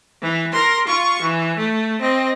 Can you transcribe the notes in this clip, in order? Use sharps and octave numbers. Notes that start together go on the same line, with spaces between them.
E3
A#4 C6
F4 C#6
E3
A3
C4 D#5